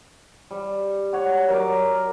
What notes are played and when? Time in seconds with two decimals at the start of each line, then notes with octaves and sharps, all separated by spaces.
0.51 G3
1.13 C#5 F#5
1.49 F#3 A#4 A#5 D6